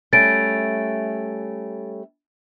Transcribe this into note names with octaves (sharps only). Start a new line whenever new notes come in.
G3 A3 C#4 A6 D7